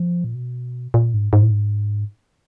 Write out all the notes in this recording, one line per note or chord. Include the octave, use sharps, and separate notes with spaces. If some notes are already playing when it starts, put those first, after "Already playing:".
Already playing: F3
A#2
B2
A#2
G#2
G#2
A2
G#2